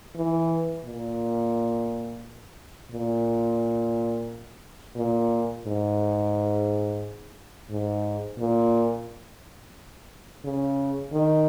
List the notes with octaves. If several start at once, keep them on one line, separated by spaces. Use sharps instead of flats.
E3
A#2
A#2
A#2
G#2
G#2
A#2
C#3
D#3